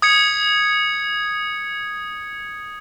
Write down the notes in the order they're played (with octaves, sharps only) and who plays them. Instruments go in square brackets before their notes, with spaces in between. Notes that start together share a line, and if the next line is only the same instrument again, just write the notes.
[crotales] D#6 G#6 C#7